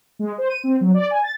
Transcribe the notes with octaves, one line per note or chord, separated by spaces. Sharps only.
G#3
C5
D#7
C4
F#3
D5
G#5
A6